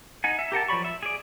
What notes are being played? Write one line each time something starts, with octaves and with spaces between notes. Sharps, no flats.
D#4 F#5 G#5
E5
G4 A#4 F#5 A5
F3 F#3 D5 B5 C#6
E5
G#4 D5